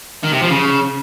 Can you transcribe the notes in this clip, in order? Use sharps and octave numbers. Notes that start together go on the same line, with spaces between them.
D#3
C3
F3
C#3